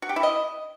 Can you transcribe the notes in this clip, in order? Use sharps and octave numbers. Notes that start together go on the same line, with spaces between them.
F#4
G4
E4
D#5